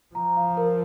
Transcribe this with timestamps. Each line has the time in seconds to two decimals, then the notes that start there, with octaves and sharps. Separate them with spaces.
0.15 F3 A#5
0.37 F5
0.57 A#4